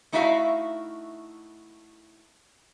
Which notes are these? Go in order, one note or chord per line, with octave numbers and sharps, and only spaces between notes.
A3 D#4 E4 F#4 E5 F5